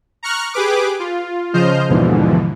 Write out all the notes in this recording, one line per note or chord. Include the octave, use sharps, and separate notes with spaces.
A#5 C#6 F6 F#6
G4 G#4 B4 D6
F4
C#3 F3 C5 D#5 F6 G6
D#2 G#2 B2 D3 E3 F3